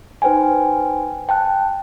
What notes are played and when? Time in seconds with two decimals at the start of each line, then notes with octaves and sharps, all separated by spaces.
0.22 D#4 B4 C5 G5 G#5
1.29 G5 A5 F#6